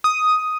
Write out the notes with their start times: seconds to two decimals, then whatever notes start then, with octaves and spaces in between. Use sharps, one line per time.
0.04 D#6